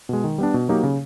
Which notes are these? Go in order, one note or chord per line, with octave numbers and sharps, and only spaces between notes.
B2 G#3
D#3
G3 B3 D4
B2
F#3 A#3 D#4 G4
C#3